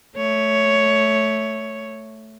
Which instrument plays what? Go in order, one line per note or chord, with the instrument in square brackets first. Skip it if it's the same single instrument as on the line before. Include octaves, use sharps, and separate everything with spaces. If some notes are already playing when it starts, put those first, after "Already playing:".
[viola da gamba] A3 C#5